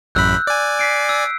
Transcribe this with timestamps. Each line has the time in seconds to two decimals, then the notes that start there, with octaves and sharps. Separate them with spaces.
0.15 A1 F#2 B5 E6 F#6 G6
0.47 D5 G#5
0.79 B6 C7 D7
1.09 E6